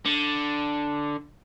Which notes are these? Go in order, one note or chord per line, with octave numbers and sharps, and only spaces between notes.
D3